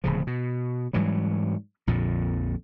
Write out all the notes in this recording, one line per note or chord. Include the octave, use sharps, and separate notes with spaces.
D1 C#3 F3
B2
G#2 E3 F#3 G3
A#1 F2 A#2 D3